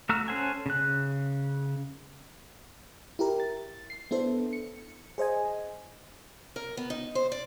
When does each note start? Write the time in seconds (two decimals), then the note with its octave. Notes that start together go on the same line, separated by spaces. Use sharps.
0.09 A3 F#4 A#5 E6 F6
0.28 C#4 A4 C5 F#5 G#5
0.66 C#3 F#6
3.19 E4 G4 A#4
3.40 A6
3.90 C7
4.11 B3 D4 E4 A4 C5
4.53 C#7
5.18 G#4 C5 D#5 G#5
6.56 A#4
6.77 B3
6.90 D#4
7.15 C5
7.32 D5